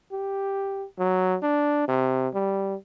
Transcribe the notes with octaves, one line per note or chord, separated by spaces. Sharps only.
G4
F#3
D4
C3
G3